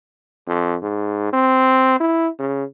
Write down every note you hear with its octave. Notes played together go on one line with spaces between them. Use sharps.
F2
G#2
C4
E4
C#3